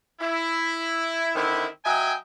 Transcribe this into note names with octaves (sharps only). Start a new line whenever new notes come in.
E4
D3 D#3 C4 E4
F#3 D#5 E5 G5 G#5